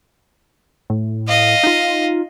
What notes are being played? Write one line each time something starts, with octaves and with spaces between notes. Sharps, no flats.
A2
D#5 F5
D#4 F4